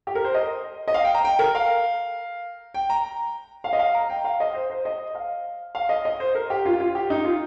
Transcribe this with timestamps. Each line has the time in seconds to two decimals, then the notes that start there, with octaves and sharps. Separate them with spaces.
0.07 G4
0.15 A#4
0.24 C5
0.34 D#5
0.88 D#5
0.94 F5
1.04 G5
1.14 A#5
1.25 G5
1.39 A#4
1.55 F5
2.74 G5
2.90 A#5
3.64 F5
3.73 D#5
3.79 F5
3.94 A#5
4.10 G5
4.24 F5
4.40 D#5
4.54 C5
4.70 C5
4.85 D#5
5.15 F5
5.75 F5
5.89 D#5
6.05 D#5
6.20 C5
6.35 A#4
6.50 G4
6.65 F4
6.80 F4
6.95 G4
7.10 D#4
7.25 F4